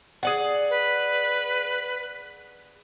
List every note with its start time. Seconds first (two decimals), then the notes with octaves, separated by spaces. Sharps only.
0.23 G#4 D5 F#5
0.70 B4